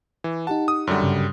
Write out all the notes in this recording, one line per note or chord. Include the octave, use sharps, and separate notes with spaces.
E3
D#4 G4 F#5 A5
D#6
F#2 D3 G3
G2 C#3